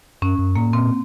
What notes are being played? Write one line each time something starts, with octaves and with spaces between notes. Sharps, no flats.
F#2 C#4
F#2
A2 A#3
A#2 C4